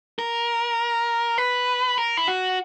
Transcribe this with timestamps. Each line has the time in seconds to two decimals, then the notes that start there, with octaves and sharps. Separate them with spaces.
0.19 A#4
1.38 B4
1.98 A#4
2.17 E4
2.28 F#4